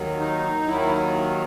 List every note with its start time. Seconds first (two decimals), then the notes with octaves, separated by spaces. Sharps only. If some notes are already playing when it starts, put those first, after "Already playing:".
Already playing: D#2 D#3 F#3
0.20 D#4
0.67 D#2 D#3 F#3 E4